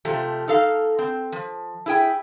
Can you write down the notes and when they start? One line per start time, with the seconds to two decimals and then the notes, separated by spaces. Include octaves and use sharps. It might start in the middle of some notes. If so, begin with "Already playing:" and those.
0.05 C3 F3 A3 G4
0.48 D#4 A4 F5
0.99 C4
1.32 F3
1.86 E4 G#4 G5